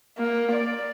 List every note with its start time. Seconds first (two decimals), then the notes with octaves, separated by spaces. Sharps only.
0.18 A#3
0.52 D5